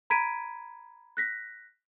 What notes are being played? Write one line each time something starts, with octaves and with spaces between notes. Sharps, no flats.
A#5 B5 G#6 B6 D7 D#7
F#6 A#6 B6